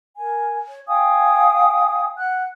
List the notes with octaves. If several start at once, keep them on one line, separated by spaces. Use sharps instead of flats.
A#4 G#5
C#5
F5 G5 G#5 D#6
F#5 F#6